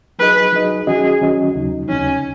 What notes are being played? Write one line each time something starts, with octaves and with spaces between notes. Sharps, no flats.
F#3 D#4 G#4 B4 D#5
F#3 D#4 G#4 D#5
D#3 F#3 C#4 F#4 G#4 D#5
D#3 F#3 C#4 F#4 D#5
D#2 C#3 F#3 D#4
D#2 C#3 F#3 C#4 D#4